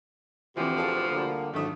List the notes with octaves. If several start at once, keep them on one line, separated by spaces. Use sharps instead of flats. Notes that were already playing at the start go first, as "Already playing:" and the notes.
D2 B2 E3 F3 C4 G4
G#4 A4 F5
D3 G3 A#3
G#2 D#3 F#3 A3 D4 D#6